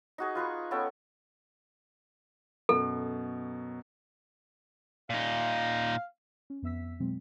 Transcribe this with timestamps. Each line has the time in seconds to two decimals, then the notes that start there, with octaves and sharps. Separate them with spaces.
0.18 D#4 F#4 G#4
0.35 F4 B4 A#5 C#6
0.71 B3 C#4 A4 G5
2.69 F#2 B2 A4
5.10 A#2 D#4 F5
6.50 C#4
6.62 F2 B3 E5 E6 B6
7.00 B2 F#3 G#3 C4